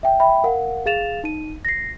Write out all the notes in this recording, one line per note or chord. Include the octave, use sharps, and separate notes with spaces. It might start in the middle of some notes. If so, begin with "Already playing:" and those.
E5 G5
E5 G5 B5
A#4 F5 F#5
G#4 F5 A6 E7 F7
D#4 D#7
A#6 C7